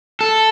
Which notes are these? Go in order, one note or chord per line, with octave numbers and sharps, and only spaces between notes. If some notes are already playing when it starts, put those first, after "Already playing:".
A4